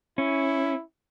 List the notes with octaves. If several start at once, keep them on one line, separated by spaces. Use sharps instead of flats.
C#4 E4